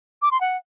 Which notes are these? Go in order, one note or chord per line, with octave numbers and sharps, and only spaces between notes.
D6
C6
F#5